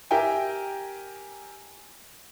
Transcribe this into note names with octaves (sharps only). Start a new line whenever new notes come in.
G4 A#4 E5 G5 G#5